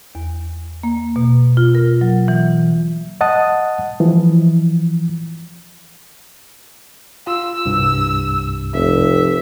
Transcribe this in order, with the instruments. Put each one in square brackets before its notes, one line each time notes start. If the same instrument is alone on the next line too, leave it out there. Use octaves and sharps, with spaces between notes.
[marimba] E2
A#3
B2
F4
A#4
F#3
E3
[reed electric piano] D#5 F#5 A5 D#6
E3 F3
[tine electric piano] F4 [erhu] E6
[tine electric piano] C2 G2
[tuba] F1 [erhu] E5